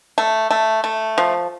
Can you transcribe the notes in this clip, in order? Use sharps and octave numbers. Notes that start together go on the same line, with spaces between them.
A3
A3
A3
F3